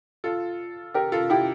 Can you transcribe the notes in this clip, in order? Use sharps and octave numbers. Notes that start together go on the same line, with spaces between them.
F4 A4
G4 A#4
F4 A4
E4 G4